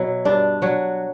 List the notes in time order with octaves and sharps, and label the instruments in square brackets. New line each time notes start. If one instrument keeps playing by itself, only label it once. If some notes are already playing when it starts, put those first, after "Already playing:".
Already playing: [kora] B2 F#3 E4
G2 D4
F#3 F#4